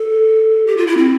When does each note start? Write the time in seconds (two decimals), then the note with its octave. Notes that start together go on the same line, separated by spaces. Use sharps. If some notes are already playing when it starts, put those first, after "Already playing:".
Already playing: A4
0.67 G4
0.77 F4
0.87 E4
0.97 C4